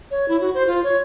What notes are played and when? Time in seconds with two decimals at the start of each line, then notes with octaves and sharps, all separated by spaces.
0.11 C#5
0.28 E4
0.41 F#4
0.54 C5
0.67 F4
0.83 C#5